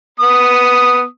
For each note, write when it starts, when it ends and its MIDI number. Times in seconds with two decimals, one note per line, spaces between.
0.20 1.04 59
0.20 1.04 87